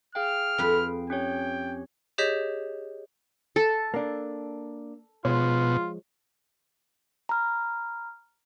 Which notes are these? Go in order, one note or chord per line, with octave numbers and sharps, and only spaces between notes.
G#4 F5 G5 F6
F2 B4
C#4 G4 C#5 G5
G4 G#4 C#5 D#5 G6 B6
A4
A#3 D4
B2 F3 G#3 F4 C#5
A#5 B5 F6